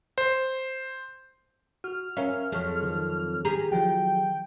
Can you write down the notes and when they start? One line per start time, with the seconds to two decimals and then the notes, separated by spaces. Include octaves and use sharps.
0.18 C5
1.84 F#4 F6
2.17 C#4 A#4 C#5 E5 F5
2.52 F2 F#3 G#4 A4 C#5
2.83 D#3
3.45 G4 G#4 A#5
3.72 F3 F#3 F4 G5